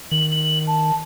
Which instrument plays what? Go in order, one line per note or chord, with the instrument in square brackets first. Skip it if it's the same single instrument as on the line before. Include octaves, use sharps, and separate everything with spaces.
[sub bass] D#3 [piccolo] F#7
[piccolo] F#7
A5